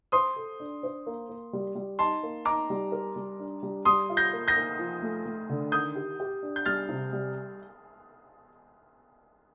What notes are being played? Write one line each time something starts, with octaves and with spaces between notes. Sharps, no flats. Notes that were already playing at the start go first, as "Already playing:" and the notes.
C5 C6 D#6
A4
D4
C5
A#3
A#3
G3
G3
D#4 A5 C6
A#3
D#4 A#5 D6
G3
A#4
G3
D4
G3
G3 C6 D#6
F4
G6 A#6
A#3
G6 A#6
A#3
F3
A3
A3
D3
D#3 D#6 G6
G4
G4
D4
G6
G3 F6 A6
C3
G3